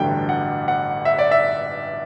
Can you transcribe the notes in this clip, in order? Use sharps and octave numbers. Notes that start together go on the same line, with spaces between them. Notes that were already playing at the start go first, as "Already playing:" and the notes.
Already playing: A1 G2 D3 F#3 A3 G5
F#5
F#5
E5
D5
E5